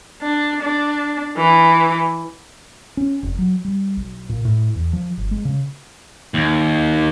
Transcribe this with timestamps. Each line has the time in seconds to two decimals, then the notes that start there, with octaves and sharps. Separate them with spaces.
0.22 D4
0.62 D4
1.37 E3
2.97 C#4
3.23 F1
3.38 F#3
3.64 G3
3.97 B1
4.29 A#2
4.45 A2
4.75 E2
4.93 F3
5.17 G1
5.31 G#3
5.45 C#3
6.34 D#2